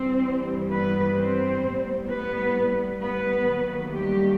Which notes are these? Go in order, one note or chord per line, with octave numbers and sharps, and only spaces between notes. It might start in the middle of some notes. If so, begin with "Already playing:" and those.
Already playing: G2 E3 G3 C4 C5
B3 B4
C4 C5
A2 G3 B3
B3 B4
B3 B4
D#2 D#3 F#3 A3
G3 G4